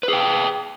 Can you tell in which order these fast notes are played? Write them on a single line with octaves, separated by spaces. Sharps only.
B4 G#4 G5